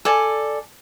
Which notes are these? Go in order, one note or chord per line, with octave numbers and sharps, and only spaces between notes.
A4 D5 G#5